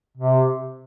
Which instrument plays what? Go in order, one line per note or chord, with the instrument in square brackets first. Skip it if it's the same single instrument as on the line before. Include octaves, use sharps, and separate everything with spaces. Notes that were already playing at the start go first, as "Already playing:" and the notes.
[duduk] C3